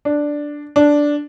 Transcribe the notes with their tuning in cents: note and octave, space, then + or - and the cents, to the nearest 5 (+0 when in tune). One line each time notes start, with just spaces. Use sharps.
D4 +0
D4 -5